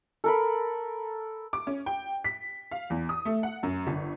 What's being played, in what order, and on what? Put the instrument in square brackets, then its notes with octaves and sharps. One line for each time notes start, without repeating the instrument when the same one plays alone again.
[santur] A4 A#4 B5
[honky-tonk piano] D6
C#4
G5
B6
F5
E2
D#6
A3
F#5
F#2
G1